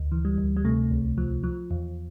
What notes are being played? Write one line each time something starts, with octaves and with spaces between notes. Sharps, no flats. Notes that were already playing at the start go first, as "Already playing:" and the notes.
Already playing: D2
E3
G3
D2
G3
C3 A3
C2
F3
F3
E2